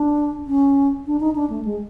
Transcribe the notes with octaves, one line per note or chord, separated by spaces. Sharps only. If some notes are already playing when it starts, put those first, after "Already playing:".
Already playing: D4
C#4
D4
D#4
D4
A3
G#3